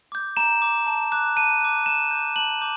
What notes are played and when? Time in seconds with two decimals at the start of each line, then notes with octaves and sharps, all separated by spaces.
0.12 D6 G6
0.37 A#5 E7
0.62 D6 G6
0.87 A5
1.12 D6 F#6
1.37 A5 D#7
1.61 D6 F#6
1.86 A5 E7
2.11 D6 G6
2.36 A5 F#7
2.61 D6 G6